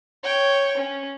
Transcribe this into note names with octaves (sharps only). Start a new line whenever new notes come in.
C#5 G5
C#4